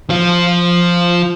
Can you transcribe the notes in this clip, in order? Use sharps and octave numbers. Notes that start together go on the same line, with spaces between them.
F3 F4